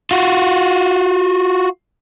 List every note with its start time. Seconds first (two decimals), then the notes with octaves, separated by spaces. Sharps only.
0.11 F4 F#4